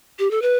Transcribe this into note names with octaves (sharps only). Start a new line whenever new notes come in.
G4
A4
B4